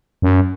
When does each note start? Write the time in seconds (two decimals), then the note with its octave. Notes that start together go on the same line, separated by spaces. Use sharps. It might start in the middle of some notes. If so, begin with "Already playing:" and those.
0.22 F#2